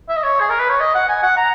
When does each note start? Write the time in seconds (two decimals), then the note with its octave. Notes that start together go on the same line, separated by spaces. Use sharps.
0.09 E5
0.16 D#5
0.23 C#5
0.41 G#4
0.50 A#4
0.60 B4
0.70 C#5
0.80 D#5
0.95 F#5
1.09 G#5
1.23 F#5
1.37 A#5